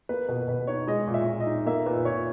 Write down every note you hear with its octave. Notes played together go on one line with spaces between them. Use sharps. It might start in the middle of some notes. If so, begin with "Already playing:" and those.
A#3 B4
B2 B4
B2 B4
D#4 C#5
G#3 D#5
A#2
E5
A#2
D#5
D#4
A#3 E5
A#2 B4
A#2 C#5